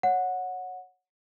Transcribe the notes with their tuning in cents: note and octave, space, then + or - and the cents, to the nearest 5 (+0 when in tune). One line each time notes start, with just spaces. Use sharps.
C#5 +0 F#5 -15